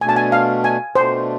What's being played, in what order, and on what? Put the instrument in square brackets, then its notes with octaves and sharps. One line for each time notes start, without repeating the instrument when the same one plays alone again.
[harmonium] B2 A3 D4 [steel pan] G#5
[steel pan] A5
G#5
F5
G#5
[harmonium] B2 A3 D4 [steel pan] C5